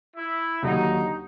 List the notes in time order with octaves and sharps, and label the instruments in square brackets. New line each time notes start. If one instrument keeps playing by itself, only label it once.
[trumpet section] E4
[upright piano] D#2 D3 F#3 [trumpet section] D#4